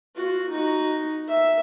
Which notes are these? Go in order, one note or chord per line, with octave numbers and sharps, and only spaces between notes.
F4 F#4
D#4 F#4
E5